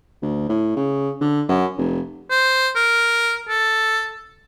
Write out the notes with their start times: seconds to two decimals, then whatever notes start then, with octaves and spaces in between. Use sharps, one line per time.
0.22 D2
0.49 A2
0.76 C#3
1.21 D3
1.49 F#2
1.77 F1
2.30 C5
2.76 A#4
3.49 A4